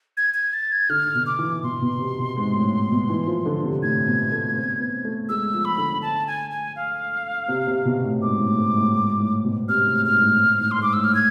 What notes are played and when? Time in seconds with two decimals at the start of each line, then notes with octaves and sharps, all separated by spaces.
0.17 G#6
0.34 G#6
0.54 A6
0.72 G#6
0.89 D3 F6
1.15 B2
1.26 D6
1.39 E3
1.63 B2 C6
1.81 B2
1.99 C3
2.18 B2
2.36 G#2
2.55 A2
2.91 B2
3.09 E3
3.27 F3
3.46 D3
3.64 C3
3.83 A2 G#6
4.07 B2
4.32 A3
4.56 C4
4.80 B3
5.05 A3
5.29 G#3 E6
5.53 F3
5.65 B5
5.78 D3
6.02 A5
6.27 G#5
6.50 G#5
6.76 F5
7.48 C3
7.67 C3
7.85 B2
8.04 A2
8.22 G#2 D6
8.40 A2
8.59 G#2
8.77 A2
8.95 G#2
9.20 A2
9.44 B2
9.68 C3 F6
9.87 A2
10.05 G#2 F6
10.23 A2
10.41 G#2
10.60 A2
10.71 C6
10.78 G#2 D6
10.93 A2 E6
11.04 F6
11.15 G#6